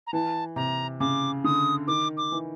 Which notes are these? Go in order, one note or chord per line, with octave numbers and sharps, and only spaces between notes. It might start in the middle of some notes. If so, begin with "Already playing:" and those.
A#5
E3 A5
C3 A#5
C#3 D6
D3 D#6
D#3 D6
D6
E3